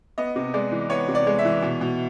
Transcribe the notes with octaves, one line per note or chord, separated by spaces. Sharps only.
B3 D#5
C3
G#3 D5
E3
B3 C#5
C3
D5
G#3
E5
E3
B2
B2